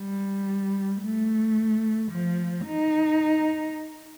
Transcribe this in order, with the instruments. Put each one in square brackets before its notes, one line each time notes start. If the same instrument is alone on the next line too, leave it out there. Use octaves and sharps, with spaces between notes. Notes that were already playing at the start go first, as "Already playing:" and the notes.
Already playing: [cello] G3
A3
F3
D#4